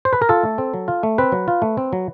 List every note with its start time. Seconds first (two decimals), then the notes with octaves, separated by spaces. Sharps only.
0.05 C5
0.13 B4
0.22 A#4
0.29 F4 A4
0.43 A3
0.58 C4
0.74 F#3
0.88 F4
1.03 A3
1.18 C4 B4
1.32 F#3
1.48 F4
1.62 A3
1.77 C4
1.93 F#3